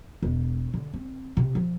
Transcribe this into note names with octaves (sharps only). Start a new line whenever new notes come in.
E1
D3
C4
C3
F3